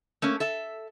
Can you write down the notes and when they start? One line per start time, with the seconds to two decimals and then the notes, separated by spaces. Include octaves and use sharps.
0.22 A3 A#3 C#4
0.40 A4 E5